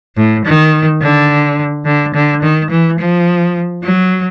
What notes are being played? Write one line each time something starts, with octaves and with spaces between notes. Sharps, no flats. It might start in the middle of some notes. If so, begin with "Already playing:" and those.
A2
D#3
D3
D3
D3
D#3
E3
F3
F#3